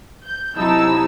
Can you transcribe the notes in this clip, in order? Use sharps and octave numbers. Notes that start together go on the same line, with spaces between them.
G6
C3 F#3 D#4 E4 A5 E6